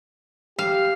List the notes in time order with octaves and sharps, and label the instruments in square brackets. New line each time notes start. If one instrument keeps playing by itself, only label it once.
[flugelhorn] G4 [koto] F5